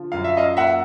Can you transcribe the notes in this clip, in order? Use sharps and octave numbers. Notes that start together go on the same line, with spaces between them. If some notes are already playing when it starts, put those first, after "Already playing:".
Already playing: D3 F3
F#2 F5
E5
D#5 F5
A#3 E5 F#5